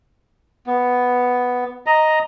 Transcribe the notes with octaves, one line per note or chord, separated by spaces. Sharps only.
B3
D#5 A#5